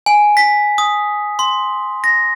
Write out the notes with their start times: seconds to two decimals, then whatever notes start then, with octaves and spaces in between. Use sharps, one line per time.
0.06 G#5
0.37 B6
0.78 D#6
1.39 C6
2.04 A#6